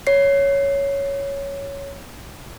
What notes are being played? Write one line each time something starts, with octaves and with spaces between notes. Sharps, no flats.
C#5 C7